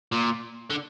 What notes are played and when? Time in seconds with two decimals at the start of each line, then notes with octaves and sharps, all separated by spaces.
0.12 A#2
0.70 D3